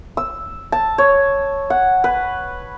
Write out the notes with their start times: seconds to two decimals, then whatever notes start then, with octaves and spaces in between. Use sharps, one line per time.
0.17 E6
0.72 A5
0.98 C#5
1.70 F#5
2.04 B4